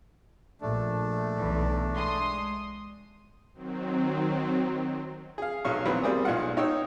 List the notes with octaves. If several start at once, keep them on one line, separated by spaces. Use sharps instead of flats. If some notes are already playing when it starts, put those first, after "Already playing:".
A#1 A3 D4
B1 E2 E3
G#3 C6 D#6
D#3 F#3 C4
G#4 F5
B1 F#3 F5 C#6
E3 F#3 B3 C4 B4
G3 A#3 C4 G#4 D#6
B1 G#3 F4 F#5
D#4 C#5 G5 E6